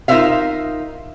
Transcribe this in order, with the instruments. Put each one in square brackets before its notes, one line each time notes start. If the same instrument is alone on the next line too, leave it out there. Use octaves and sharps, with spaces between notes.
[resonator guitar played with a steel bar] D#4 F4 A#4 C5 E5 F5